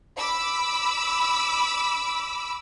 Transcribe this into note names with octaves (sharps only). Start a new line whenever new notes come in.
B5 D6 E6